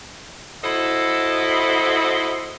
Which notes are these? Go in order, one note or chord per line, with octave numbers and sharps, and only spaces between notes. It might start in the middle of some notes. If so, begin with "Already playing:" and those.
E4 F#4 A4 C5 D#5